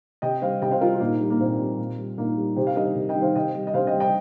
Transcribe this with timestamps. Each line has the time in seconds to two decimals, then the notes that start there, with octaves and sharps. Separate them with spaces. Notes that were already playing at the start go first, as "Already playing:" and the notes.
0.22 C3 D#5 G5
0.42 G3 C5 F5
0.61 C3 D#5 G5
0.71 C5 F5
0.81 G3 F4 A#4
0.94 F4
1.00 A#2 A#3 D#4
1.20 G3
1.30 A#3
1.40 A#2 C4
1.59 G3
1.78 A#2
1.98 G3
2.18 A#2 A#3 D#4
2.37 G3
2.56 C3 G4 C5
2.67 F5
2.76 D#3 G3 A#4 D#5
2.95 C3
3.09 D#5 G5
3.16 D#3 G3
3.22 C5 F5
3.35 C3 D#5 G5
3.54 G3
3.67 D#5
3.74 C3 C5 F5
3.87 D#5 G5
3.93 G3
4.00 D#5 G5